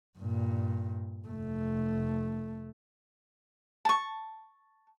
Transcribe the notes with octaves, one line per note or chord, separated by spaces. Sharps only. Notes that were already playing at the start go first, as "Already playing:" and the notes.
G2 A#2
F1 A3
A5 C#6